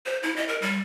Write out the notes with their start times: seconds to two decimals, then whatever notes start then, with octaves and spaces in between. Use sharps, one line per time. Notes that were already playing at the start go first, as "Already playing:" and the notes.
0.06 C5
0.23 E4
0.36 D#5
0.48 A#4
0.62 G3